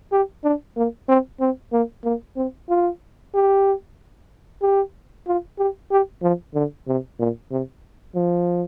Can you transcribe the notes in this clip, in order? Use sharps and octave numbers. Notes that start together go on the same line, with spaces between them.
G4
D4
A#3
C4
C4
A#3
A#3
C4
F4
G4
G4
F4
G4
G4
F3
D3
C3
A#2
C3
F3